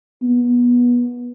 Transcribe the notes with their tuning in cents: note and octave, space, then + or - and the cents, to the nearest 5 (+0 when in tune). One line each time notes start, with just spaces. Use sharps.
B3 -20